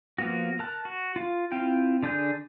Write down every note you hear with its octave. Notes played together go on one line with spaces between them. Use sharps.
F3 A#3 B3 F#4
A#4 A5 F#6
F#4
F4 F5
C4 E4 F4 G5
D3 D4 G#4 G6